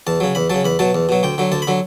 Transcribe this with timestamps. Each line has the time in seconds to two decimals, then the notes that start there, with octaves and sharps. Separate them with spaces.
0.07 E2 A5
0.20 C#3 F#3
0.35 E2 B5
0.50 C#3 F#3 A5
0.65 E2 B5
0.79 B2 F#3 A5
0.95 E2
1.09 B2 F#3
1.23 D2 G5
1.38 D3 F#3
1.52 D2 A5
1.62 B5
1.67 D3 F#3